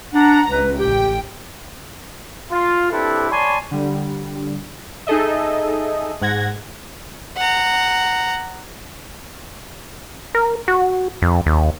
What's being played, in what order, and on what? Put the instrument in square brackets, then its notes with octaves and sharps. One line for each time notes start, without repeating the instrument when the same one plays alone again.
[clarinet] D4 [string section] F#5 A#5
[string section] C#2 [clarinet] B4
[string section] A1 G5 [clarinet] G4
[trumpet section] F4
C4 D4 E4 G4 A4 B4
C#5 D5 G#5 A5 B5 C6
[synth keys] D3 G3
D#4 G#4 A4 D#5 E5
G#2 F#5 G#6 A#6
[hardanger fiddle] F#5 A#5
[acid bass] A#4
F#4
F2
D#2